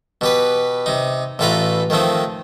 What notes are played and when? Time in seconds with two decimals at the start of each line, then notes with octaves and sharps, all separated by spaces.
0.21 B2 G4 B4
0.86 C3 D#4
1.39 A1 A2 F4 A4 B4 A#5
1.90 D#3 F3 A3 C4 D#4